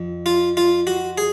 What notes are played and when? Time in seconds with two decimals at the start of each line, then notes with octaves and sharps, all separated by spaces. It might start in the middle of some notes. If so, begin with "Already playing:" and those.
Already playing: F2
0.26 F4
0.57 F4
0.87 F#4
1.18 G#4